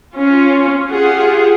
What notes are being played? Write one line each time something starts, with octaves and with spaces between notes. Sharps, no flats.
C#4 F4
F4 G4 G#4 F#5